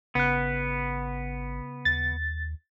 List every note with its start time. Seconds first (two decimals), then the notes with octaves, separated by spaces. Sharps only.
0.15 G#1 C#3 B3 F#6
1.85 D#2 A6